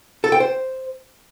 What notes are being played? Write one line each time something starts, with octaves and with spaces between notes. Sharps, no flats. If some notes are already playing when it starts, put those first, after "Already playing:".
A4
G5
C5